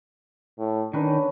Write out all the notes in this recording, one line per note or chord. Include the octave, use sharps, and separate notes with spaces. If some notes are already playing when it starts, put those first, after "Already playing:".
A2
D#3 C#4 D4 B4